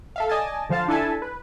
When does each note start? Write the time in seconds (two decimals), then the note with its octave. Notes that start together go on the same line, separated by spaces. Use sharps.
0.16 A4 E5 F5
0.29 D5 D#5 G#5 A5
0.69 D3 F3 C5 F5 A5
0.88 D4 E4 A4 E5 G#5 A5
1.22 B4